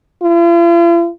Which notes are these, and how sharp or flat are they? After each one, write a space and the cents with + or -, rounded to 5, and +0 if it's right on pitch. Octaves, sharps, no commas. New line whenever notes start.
F4 -45